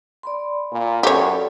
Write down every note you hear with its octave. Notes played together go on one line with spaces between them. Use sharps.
D5 B5 C6
A#2
F#2 G4 A4 C#5 D5